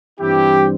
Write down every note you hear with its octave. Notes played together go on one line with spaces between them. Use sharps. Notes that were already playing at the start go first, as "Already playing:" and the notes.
G2 E3 G3 C4 E4 G4